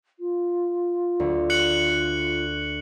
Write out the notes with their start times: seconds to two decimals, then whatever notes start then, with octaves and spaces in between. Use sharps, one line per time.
0.19 F4
1.20 D2
1.50 F#6 C#7 F#7